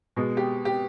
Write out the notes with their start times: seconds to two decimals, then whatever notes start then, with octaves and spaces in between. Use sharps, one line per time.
0.16 B2 G#3
0.37 G4
0.65 G4